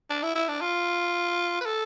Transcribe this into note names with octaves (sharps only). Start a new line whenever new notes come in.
D4
E4
E4
D4
F4
B4
A4